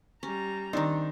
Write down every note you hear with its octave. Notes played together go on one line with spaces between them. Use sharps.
G3 C#4 A#5
D#3 C4 D4 D#4